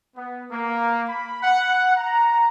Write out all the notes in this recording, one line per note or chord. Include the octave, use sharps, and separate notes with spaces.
B3
A#3
B5
F#5
A#5